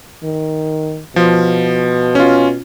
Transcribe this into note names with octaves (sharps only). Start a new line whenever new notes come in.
D#3
B2 F3
C#4 F4